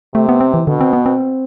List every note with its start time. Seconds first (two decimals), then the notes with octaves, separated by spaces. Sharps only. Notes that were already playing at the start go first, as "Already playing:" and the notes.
0.15 C3 A3
0.29 B3
0.40 C4
0.54 E3
0.67 B2 D3
0.81 C4
0.93 B3
1.06 C4